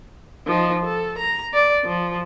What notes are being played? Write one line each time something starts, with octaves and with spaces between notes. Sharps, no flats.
F3 D#4
A4
A#5
D5
F3